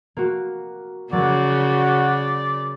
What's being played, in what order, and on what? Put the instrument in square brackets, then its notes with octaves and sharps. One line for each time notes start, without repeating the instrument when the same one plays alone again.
[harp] A#3 F#4
[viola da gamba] C#3 [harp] F#3 A#3 [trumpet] F#4 [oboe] D5